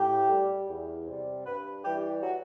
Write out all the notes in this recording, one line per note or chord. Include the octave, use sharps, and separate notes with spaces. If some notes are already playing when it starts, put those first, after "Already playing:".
Already playing: A2 G4
G3
E2
C3 G3
G2 B4
E3 G3 G4
F#4